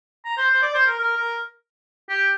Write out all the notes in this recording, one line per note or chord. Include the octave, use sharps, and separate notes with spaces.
A#5
C5
C5
D5
C5
A#4
A#4
A#4
G4